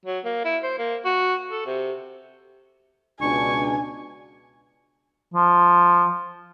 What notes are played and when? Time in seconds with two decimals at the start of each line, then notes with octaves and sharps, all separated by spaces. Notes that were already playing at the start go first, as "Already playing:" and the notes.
0.05 F#3
0.25 A#3
0.45 E4
0.63 C5
0.79 A#3
1.05 F#4
1.49 A4
1.66 C3
3.21 C#2 B2 D4 G#5 C#6
5.34 F3